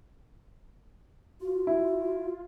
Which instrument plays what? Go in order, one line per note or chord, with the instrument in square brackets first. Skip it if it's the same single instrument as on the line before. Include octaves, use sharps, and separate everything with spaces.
[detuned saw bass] F4 [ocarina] F#4
[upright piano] E4